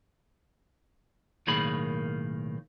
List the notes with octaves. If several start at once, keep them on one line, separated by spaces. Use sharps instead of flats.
B1 A2 D#3 A#3 G#4 B5